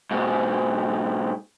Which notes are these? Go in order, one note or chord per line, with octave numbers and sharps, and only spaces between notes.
G#2 B2